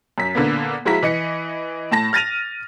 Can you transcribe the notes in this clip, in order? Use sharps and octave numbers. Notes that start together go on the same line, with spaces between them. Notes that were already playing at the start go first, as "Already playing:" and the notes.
F#2 B6
A#2 D3 A#3 B3
F3 G#3 E4 F#4 A#5 B6
E3 D#5 C#7
A2 A5 A#6
F6 A6 A#6 D#7 F7